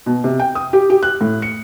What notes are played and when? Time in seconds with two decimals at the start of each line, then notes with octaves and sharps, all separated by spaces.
0.06 B2
0.24 C3
0.40 G5
0.55 D#6
0.73 G4
0.90 G4
1.03 F#6
1.21 A2
1.42 C#7